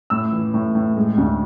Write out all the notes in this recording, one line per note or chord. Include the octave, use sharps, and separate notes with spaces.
A2 E6
E3
A2
A2
G#3
D2